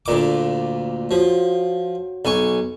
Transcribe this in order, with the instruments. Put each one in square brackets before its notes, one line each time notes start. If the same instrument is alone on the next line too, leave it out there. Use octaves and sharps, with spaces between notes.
[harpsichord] D2 A#2 D6
[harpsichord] F3 [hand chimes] F#4 C#5
[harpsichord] B1 G#5 C#6